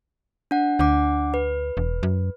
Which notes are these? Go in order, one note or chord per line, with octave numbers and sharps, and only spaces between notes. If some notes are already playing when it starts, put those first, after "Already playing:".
D4 F#5
D2 D4 F#5 D6
B4
E1
F#2